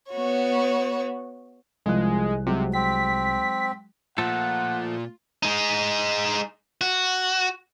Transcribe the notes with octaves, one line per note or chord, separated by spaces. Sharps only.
B3 F#4 C#5
C2 F3 G#3 F#6
C3 F#3 G#3
C4 B6
A#2 F3 A3 F4 A4 F#5
G#3 D#4
F#4